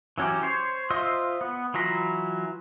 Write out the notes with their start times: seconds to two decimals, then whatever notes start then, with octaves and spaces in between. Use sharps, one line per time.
0.18 E3 F#3 C#4 F#4 G4
0.43 C5 C#5
0.90 F4 C5 D#5 E5 C6
1.41 B3
1.74 E3 F#3 F4 A#5 B5